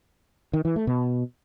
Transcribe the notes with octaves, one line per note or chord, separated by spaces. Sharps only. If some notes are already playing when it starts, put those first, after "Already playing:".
D#3
E3
A3
B2